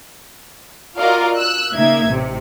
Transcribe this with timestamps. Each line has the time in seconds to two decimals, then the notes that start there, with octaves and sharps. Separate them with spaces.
0.97 F4 F#4 A#4 D5 D#5 F5
1.36 E6 F#6
1.75 C#3 A#3 D#4 E5 G#6
2.07 A1 C3